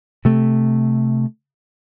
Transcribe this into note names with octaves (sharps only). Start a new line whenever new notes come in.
C3 A3